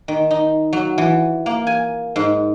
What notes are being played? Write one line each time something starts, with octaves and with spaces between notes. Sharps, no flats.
D#3
D#4
F#3
E3
A#3
G#5
G#2